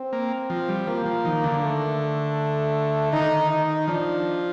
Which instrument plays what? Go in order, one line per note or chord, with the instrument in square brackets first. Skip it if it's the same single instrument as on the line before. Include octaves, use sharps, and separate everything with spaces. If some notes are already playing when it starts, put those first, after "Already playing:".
Already playing: [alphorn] C4
[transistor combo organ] A#3
F3
G3
[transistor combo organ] F3 [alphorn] A#3
[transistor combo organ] F3
D#3
D3
[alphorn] A3
[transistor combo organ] D#3 [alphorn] D#4
[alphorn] D#4
[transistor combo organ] F3 [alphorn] D4